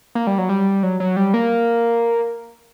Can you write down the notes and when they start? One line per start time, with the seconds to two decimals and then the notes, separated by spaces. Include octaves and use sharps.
0.15 A#3
0.27 G3
0.38 F#3
0.49 G3
0.83 F#3
1.00 F#3
1.17 G3
1.34 A#3